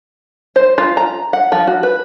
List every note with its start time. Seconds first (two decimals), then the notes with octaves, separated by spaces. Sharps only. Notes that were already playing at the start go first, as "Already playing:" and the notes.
0.56 C5
0.78 F4
0.97 A#5
1.33 F#5
1.52 F3
1.67 F#4
1.83 B4